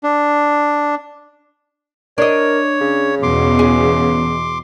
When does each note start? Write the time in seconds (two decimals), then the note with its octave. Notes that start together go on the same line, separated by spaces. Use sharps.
0.03 D4
2.18 D4 A#4 C#5 D#5
2.81 C#3
3.23 E2 B2 C6 D6
3.59 G#4